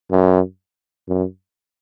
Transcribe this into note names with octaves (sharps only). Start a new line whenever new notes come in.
F#2
F#2